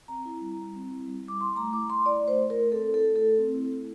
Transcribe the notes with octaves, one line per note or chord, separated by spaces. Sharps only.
C4 A#5
E4
G3
G3
C4
E4
G3
G3 D6
E4 C6
A3 A#5
E4 D6
A3 C6
E4 D5
A3 C5
E4
A#4
A3
C4 A4
E4
A4
A3
A4
A3
C4
E4
A3